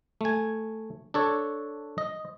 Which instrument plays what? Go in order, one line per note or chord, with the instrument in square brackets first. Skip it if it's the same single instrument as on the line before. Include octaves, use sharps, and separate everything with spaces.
[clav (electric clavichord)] A3 G#5
D4 A4 C#5
D#5